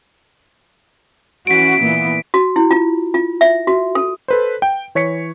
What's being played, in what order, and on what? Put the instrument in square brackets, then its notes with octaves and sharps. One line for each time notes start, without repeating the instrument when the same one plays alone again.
[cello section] E3 C#4 F#4 [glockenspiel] B6 D7
[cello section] A#2 E3 B3
[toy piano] F#4
E4
F4
F4
E5
F#4
A4
[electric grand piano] A4 B4 C5
G5
E3 C#5 B6 C#7